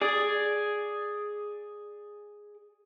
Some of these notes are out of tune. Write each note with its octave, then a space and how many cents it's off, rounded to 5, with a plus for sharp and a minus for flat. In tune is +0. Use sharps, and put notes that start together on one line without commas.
G#4 +0 D5 +0